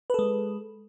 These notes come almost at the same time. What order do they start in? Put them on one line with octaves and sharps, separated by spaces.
B4 A4 G#3